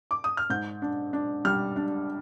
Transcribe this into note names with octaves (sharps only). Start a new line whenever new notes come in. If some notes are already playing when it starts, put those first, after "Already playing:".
D6
D#6
F6
G#2 G6
D4
D4
G3 F6
D4